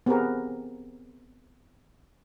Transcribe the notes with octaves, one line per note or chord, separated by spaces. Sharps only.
B3 C4 G4 G#4 A#4